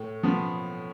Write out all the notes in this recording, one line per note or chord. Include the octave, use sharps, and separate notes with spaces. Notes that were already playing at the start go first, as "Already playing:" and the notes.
Already playing: A2
F3 B3